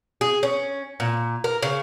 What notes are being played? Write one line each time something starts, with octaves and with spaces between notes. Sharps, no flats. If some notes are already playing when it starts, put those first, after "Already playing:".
G#4
C#4
A#2
A#4
C#3